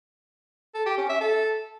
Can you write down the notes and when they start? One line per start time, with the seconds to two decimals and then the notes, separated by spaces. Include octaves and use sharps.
0.75 A4
0.86 G4
0.98 C#4
1.09 E5
1.21 A4